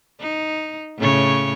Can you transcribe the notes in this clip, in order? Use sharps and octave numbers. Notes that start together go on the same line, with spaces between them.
D#4
A2 C#3 C#5